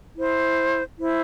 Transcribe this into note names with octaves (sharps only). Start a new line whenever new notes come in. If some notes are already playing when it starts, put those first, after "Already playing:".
E4 C5
E4 C5